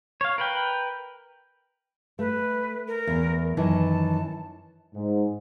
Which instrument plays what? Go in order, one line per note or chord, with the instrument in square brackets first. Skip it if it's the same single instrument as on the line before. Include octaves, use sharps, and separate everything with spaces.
[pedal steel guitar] C#5 F5
A#4 B4 G5
[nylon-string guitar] A3 [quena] B4
[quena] A#4
[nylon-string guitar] E2
[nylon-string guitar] F#2 D#3 E3 [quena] A5
[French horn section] G#2